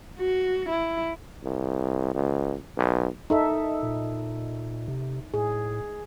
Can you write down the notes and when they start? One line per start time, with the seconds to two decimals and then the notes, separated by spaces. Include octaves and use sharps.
0.19 F#4
0.69 E4
1.44 C2
2.14 C#2
2.77 B1
3.30 D#4 A4 E5
3.83 A#2
4.88 C3
5.34 A2 G#4